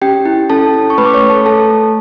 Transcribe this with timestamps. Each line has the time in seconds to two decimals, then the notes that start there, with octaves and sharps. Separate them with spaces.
0.01 C#4 G4 G5
0.25 E4
0.50 C#4 A4 A5
0.74 C#4
0.90 C#6
0.98 A3 B4 B5
1.05 D6
1.14 C#5 C#6
1.22 A3
1.30 A4 A5
1.46 A3 A4 A5
1.70 A3